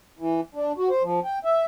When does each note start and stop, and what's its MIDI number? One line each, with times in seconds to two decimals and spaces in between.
0.19 0.41 52
0.55 0.72 62
0.78 0.89 66
0.90 1.03 72
1.03 1.20 53
1.24 1.39 79
1.45 1.65 76